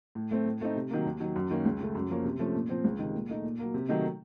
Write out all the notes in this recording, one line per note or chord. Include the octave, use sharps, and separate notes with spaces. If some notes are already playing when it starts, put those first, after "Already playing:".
A2
A3 C4
A2
A3 C4 D#4
C3
D#3 F#3 A#3
D#2
D#3 F#3
F#2
D#3 A#3 C#4
C#2
C#3 A3
F#2
F3 A#3 C#4
C3
F3 A3 C#4
A#2
F3 C4
C#2
C3 D#3
A#2
A3 D#4
A#2
F#3 A#3
C3
D#3 F#3 A3 D#4